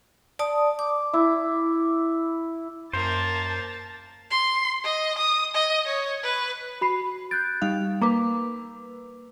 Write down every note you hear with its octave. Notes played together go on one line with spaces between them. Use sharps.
D5 A5 D#6
D6
E4
F#2 A#3 C5 A5 A6
C6
D#5
D#6
D#5
C#5
B4
F#4 B5 C7
F#6 G6 A6 D7
G3 D#4 F5
A#3 B4 A#5 D6